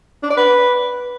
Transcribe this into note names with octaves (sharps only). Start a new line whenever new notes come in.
D4
D5
B4